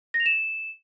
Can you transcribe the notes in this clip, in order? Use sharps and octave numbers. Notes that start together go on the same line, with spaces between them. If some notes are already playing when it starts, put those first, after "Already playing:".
A#6
F7
E7